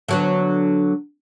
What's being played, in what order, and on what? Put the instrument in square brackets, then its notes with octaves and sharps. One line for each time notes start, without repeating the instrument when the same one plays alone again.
[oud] D3 F#3 B3